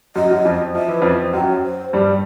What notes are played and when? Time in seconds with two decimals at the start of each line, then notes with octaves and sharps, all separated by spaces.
0.16 F#2 F#3 D#5
0.30 F#2 F#3
0.45 F2 F3
0.75 F3 E5
0.88 E3
1.01 F2 F3
1.34 F#2 F#3 G5
1.49 C#5
1.64 C5
1.93 G2 G3